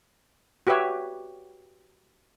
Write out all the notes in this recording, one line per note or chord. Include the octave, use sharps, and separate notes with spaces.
F#4 G4 B4 C#5 E5